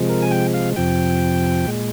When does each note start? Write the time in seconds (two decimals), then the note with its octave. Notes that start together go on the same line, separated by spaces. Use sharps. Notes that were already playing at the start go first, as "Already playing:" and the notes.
Already playing: C3 F3 G#3
0.09 A#4
0.22 G#5
0.31 G5
0.54 F5
0.76 F2 C3 F3 G5
1.67 A#2 G#3